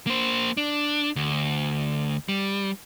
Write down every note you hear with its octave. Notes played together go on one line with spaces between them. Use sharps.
A#3 C5
D4
D2
G3